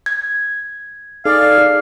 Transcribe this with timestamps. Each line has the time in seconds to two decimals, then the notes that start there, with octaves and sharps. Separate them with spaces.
0.06 G#6
1.25 D#4 G#4 A4 D5 F5